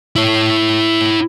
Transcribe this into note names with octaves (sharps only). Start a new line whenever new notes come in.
E4 C#5